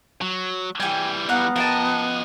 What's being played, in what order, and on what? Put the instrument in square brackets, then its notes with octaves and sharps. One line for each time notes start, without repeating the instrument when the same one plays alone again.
[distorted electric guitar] F#3
[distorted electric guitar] E3 G3 [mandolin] G5 G#5
[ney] B3 [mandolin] F5 F#5 A#5
[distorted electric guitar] F3 D#5 [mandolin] A#4 G5 A5